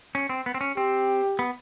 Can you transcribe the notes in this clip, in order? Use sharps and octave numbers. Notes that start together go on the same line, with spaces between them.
C#4
C4
B3
C4
C#4
C4 G4
B3